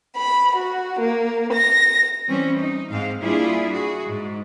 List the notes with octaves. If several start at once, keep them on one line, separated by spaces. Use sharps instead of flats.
B5
F#4
A#3
A#6
E3 G3 C4 C#4
D#4
G#2 C4 F5
G3 A#3 D4 E4 F4 G#4
F#4 G#4
G#2